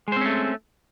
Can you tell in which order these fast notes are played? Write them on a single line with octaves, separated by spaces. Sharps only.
G#3 C5 C4 C#4 A3